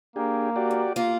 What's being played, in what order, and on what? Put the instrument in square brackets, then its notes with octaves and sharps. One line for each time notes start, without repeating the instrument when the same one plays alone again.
[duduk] A#3 [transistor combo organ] D4 G4 G#4
[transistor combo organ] F#4 G4 D5
[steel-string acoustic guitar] F2
A#3 F4